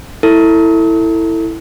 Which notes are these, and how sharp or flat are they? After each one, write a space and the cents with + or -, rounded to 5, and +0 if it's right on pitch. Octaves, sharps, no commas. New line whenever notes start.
E4 -5 A4 +25